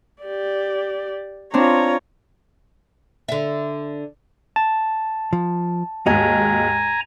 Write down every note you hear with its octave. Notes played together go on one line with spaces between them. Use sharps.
G4 D5
C4 D4 F4 C#5 A#5
D3 E5
A5
F3
D#2 G#2 F#4 D#5 G#5 A#5